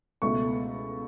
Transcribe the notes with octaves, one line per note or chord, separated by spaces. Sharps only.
C#2 B2 A3 C#6